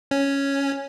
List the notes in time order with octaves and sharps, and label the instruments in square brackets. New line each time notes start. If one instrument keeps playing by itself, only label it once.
[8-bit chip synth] C#4